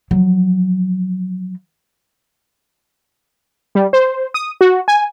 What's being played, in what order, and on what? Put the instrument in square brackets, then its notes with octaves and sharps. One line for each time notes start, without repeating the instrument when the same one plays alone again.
[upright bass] F3 F#3
[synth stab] G3
C5
D#6
F#4
G#5